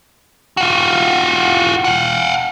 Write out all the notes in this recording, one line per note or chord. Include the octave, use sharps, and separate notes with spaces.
F4 F#4
F5 F#5